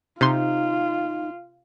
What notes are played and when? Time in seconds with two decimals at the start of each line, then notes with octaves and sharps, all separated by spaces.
0.21 C3 D#4 F4 C6